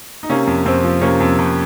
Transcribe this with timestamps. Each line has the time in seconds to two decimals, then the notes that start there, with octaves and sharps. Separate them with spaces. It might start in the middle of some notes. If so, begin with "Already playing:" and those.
0.23 D#4
0.29 C3 A#3 C#4
0.47 F2
0.66 F2 C4
0.84 F3
1.01 C3 A#3 C#4
1.20 F2
1.38 F2